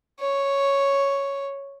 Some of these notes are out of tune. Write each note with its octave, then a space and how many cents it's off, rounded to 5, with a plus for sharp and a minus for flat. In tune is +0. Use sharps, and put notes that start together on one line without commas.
C#5 +0